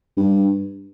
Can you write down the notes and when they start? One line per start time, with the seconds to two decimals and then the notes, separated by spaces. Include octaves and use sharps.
0.17 G2